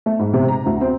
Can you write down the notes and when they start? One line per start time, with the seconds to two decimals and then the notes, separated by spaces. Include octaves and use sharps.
0.06 A3
0.19 G#2
0.34 C3
0.48 A#5
0.66 D2
0.81 C4